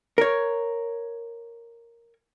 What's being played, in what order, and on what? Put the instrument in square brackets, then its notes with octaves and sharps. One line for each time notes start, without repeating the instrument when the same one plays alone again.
[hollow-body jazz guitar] A#4 C#5